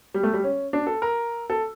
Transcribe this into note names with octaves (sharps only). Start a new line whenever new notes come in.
G3
A3
G3
C#4
D4
A4
A#4
A4